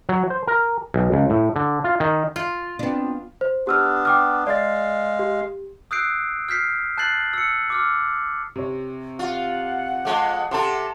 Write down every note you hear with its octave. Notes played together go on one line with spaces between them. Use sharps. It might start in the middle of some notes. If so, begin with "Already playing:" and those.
F#3
C5
A#4
B1
C#2
A2
D3
F4
D#3
F4
B3 C4 D4
C5
B3 D4 G4 E6 F6
G5 D6 F6
G#3 D5 F5 A6
G4
D#6 E6 F#6 G6 C7 D7
F6 G6 B6 C7
A5 F#6 G6 A6 C7 F#7
E6 C#7
D6 E6 F6
C3 C#5
F4 F#5
F2 G#3
C3 A4 A5 C6